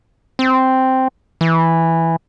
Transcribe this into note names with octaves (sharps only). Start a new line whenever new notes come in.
C4
E3